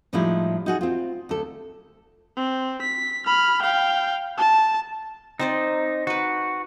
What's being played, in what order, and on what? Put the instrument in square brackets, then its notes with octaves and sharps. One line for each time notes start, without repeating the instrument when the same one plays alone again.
[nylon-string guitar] A2 F3 G3 G#3 D#4 E4
D#4 F#4 G#4
C4 F4
D2 A4
[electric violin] C4
B6
B5 F6
F5 G5
A5
[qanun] C4 C5 D5 [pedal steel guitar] D#4
[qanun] D#4 B4 [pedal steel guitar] F#4